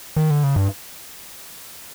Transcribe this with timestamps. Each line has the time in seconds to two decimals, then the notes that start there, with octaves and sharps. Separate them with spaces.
0.16 D#3
0.31 D3
0.43 C#3
0.56 G2